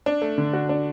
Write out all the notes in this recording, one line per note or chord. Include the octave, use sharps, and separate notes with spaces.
D4
A3
D3
F#4
D4